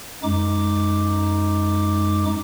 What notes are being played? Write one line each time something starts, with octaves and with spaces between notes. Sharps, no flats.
F#2 G#3 D#4 D6